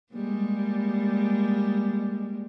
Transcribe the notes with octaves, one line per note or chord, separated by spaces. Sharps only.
G3 G#3 A#3